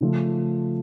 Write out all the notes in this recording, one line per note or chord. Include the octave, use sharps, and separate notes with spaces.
C#3 F3 A3